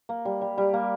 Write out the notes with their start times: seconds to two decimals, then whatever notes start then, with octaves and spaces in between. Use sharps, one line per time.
0.09 A#3
0.25 G3
0.41 G3
0.58 G3
0.74 A#3